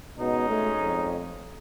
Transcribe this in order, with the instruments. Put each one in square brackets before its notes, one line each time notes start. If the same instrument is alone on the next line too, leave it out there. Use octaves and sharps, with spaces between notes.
[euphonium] B2 [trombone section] G#3 C#4 D#4
[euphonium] A3
F2